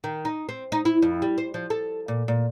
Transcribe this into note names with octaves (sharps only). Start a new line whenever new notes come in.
D#3
D#4
C4
D#4
E4
F2
G3
C5
F3
A4
A#2
A#2